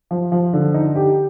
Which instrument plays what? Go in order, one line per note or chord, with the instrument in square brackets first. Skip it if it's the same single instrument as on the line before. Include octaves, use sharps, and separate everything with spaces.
[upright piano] F3
F3
D3
D#4
G4